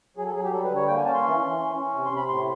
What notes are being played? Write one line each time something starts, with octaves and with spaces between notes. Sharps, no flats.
F#3 G#4
A4
F#3 G#4
G4
G3 A4
B4
D3
C#5
A#3 G5
G#5
C#4 A5
C6
E3
E3
C#4
C#4
C3
C6
C3
B5
A2 C6